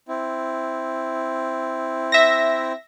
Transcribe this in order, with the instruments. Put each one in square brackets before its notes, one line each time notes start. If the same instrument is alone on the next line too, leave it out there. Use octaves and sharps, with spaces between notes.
[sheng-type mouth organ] C4 E4
[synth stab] E5 A#6